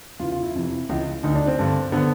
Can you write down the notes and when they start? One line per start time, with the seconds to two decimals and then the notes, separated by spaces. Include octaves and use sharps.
0.20 E2 C#3 E3 F4
0.32 F4
0.43 E4
0.55 F2 C3 E3
0.89 C#2 C#3 E3
1.23 D2 D3 D#4
1.35 D4
1.47 C4
1.59 G2 D3
1.92 D3 B3